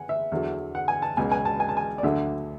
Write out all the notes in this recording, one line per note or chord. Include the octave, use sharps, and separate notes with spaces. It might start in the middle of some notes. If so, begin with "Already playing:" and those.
Already playing: F#5 G#5
E5
E2 D3 F#3
F#5
G#5
A5
C#2 B2 F#3 G#5
G#5
A5
G#5
A5
G#5
D5
D2 D3 F#3 E5